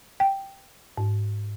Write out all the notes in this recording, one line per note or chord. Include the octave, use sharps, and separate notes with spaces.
G5
G#2